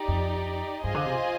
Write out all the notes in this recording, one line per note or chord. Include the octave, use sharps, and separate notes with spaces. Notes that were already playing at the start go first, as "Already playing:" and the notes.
Already playing: D#4 G4 D5
F2
G2 F4 G#4 C5 D#5 G#5
D3
C3